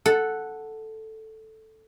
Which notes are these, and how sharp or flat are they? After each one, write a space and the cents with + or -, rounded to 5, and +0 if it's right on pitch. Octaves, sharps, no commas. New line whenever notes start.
A4 +0 F#5 +0